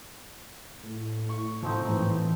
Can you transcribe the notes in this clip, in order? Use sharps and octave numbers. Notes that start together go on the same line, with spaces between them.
A2
C#6
G#2 F3 C4 D#4
E3